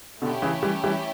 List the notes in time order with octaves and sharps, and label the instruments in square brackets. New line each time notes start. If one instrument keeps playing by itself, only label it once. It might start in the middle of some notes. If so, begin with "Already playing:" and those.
[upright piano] B2 D3 [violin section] A3 C#4 E4 G4
[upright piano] C#3 E3
E3 G3
E3 G3